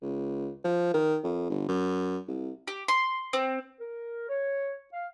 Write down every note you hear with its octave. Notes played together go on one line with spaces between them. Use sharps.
C#2
F3
D#3
F2
G1
F#2
C2
G4
C6
C4
A#4
C#5
F5